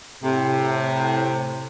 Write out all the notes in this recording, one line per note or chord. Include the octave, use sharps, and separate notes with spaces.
A2 C3